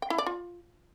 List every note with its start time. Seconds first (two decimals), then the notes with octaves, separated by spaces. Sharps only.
0.02 G5
0.10 E4
0.18 D5
0.26 F4